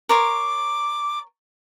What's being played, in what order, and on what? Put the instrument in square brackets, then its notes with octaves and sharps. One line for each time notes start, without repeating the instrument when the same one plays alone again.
[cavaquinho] A#4 C#5 C6 [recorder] D6